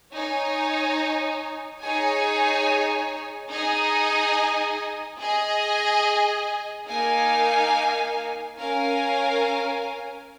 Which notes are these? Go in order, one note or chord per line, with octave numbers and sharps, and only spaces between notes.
D#4 C#5 G#5
D#4 G#4 C#5 G#5
D#4 G#4 D#5 G#5
G#4 D#5 G#5
A#3 D#4 A#4 F5 G#5
C#4 A#4 F5 G#5